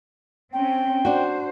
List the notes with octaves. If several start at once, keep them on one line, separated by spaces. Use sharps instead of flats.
C4 C#4 G5
D4 F#4 C5